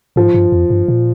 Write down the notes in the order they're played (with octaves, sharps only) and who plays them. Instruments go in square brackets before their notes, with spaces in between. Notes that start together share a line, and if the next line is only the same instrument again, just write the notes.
[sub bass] G#2 [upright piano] F3
[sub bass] G2
F2
G2
A#2